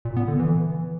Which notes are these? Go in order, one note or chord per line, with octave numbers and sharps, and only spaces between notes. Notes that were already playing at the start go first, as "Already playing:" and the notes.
A#2
B3
D3
E3